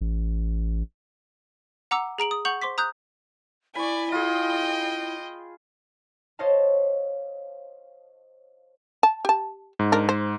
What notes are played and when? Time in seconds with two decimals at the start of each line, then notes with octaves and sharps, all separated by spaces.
0.01 A1
1.91 F#5 A#5 D6 E6
2.18 G#4 A#5 D7 F#7
2.31 D#6
2.45 F#5 C#6 G6 F7 F#7
2.62 C5 C6 D6 B6
2.78 A#5 D#6 F#6 G6
3.75 E4 D5 G#5 B5 C#6
4.12 F4 G#4 D#5 G5
6.39 C5 C#5 D#5 F5 A5
9.03 A5
9.25 G4 A5
9.79 G#2
9.92 D4 A#4
10.09 C5